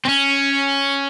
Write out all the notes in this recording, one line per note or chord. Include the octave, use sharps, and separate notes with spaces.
C4
C#4